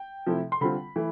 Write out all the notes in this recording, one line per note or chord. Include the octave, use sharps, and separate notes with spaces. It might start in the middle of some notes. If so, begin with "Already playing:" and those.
Already playing: G5
C3 F3 A3 E4
C6
D3 G3 C4 F4 B5
E3 A3